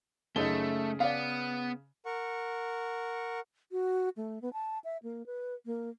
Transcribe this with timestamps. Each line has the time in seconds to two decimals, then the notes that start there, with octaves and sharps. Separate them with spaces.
0.36 F#2 C#3 A3 D#4 G7
1.00 B3 D5 F5
2.05 A#4 F#5 C#6
3.72 F#4
4.17 A3
4.42 B3
4.53 A5
4.84 E5
5.03 A#3
5.26 B4
5.66 A#3